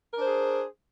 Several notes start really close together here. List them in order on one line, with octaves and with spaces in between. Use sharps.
A#4 D4 C5 G#4